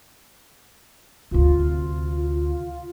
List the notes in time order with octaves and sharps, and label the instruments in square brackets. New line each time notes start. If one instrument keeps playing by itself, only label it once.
[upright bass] D2 C3 [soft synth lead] F4